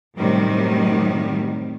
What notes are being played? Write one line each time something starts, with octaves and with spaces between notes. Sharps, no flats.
F#2 A2 C3 D#3 G3